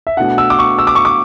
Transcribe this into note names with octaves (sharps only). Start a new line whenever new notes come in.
E5
B2 A3 D4 F#5
E6
D6
C#6
E6
D6
C#6
D6